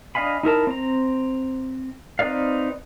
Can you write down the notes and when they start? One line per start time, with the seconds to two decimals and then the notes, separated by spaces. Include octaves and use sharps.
0.15 D4 D#5 F5 G#5 B5
0.43 D#4 E4 A#4 A5
0.67 C4 A#5
2.19 C4 D#4 B4 D5 F5